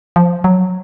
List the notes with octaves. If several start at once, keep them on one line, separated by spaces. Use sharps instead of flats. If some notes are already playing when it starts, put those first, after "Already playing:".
F3
F#3